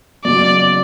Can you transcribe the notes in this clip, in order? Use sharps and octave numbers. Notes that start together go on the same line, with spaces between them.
F#1 E2 C#3 F#3 D5